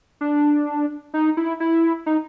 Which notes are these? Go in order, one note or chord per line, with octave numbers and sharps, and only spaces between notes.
D4
D#4
E4
E4
D#4